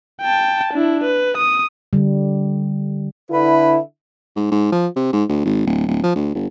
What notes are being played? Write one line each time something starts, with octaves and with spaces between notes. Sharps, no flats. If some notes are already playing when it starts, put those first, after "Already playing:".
G5 A5
D4 E4
B4
D#6
D3 G3
D3 E4 B4
G#2
G#2
F3
C3
G#2
D2
G#1
D1
D1
F3
D2
G1